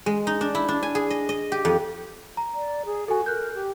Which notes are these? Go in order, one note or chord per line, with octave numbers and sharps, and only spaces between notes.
G#3
D#4
D4
E4
D4
G#5
G#4
D#5
D#5
G4
F2
A#5
D5
G#4
F#4 A4 G#5
A#4 F#6 G6
G4